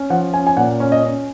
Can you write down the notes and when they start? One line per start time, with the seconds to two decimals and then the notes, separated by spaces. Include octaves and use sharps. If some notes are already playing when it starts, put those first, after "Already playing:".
Already playing: C#4
0.10 F3 F#5
0.34 C#4 G#5
0.47 G#5
0.57 A#2 F#5
0.80 C#4
0.92 D#5
1.03 C#4